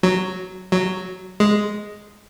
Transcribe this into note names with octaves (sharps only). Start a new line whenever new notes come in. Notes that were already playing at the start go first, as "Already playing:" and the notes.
F#3
F#3
G#3